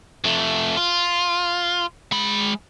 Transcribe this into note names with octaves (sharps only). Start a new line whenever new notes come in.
F2 A3
F4
G#3 B5